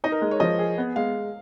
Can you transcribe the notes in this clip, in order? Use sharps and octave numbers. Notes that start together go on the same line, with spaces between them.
D#4 D#5
A#4
G#3
C#5
F3 D#5
G#4
B3
G#3 F5